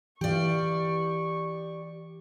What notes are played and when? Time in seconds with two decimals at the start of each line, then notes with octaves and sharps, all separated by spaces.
0.21 E3 G4 D5 F5 C#6